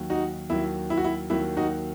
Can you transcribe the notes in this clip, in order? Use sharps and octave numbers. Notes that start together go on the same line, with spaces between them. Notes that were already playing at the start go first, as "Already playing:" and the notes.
Already playing: D#2 D#3 F#3
D#4 F#4
D#2 D#3 F#3 E4
E4
F#4
E4
D#2 D#3 F#3 E4
D#4 F#4